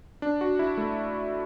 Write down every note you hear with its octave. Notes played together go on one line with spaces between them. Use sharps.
D4
F#4
E4
A3